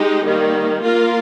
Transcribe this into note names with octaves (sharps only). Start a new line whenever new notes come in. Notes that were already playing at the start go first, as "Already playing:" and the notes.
Already playing: G#3 D#4 G4
D#3 G3 A#3
A#3 F4 A#4